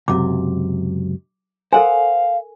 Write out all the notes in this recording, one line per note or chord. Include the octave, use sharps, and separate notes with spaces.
C#2 F#2 C3 D6
A4 A#4 C5 F5 F#5 G#5